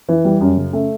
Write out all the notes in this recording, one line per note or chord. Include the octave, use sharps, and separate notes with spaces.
E3
G3
F#2
C#3
A3